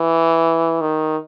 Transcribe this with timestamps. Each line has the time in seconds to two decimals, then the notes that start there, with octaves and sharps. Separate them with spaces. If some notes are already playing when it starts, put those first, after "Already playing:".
Already playing: E3
0.81 D#3